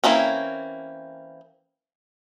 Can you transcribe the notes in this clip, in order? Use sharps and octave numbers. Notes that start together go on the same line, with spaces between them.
E3 A#3 C4 C#4